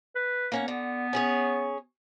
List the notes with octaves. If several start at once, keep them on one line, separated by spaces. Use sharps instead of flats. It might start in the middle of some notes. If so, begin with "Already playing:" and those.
B4
A#3 C#4 F#5
D3 B3
C#4 G#4 C#5